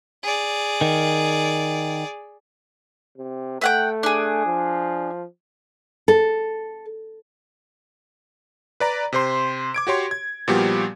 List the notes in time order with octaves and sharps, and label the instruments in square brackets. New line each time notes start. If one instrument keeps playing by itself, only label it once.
[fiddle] G#4 D5
[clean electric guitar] D#3
[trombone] C3
[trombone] A3 [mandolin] E5 F#5 G5
[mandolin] D4 G#4
[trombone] F3
[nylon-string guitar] A4
[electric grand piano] B4 D5 A#5
C3 C5 C6
D6 G#6 D7
F#4 G4 C#5 C6
G#6
A#2 F3 G3 B3 F#4 G4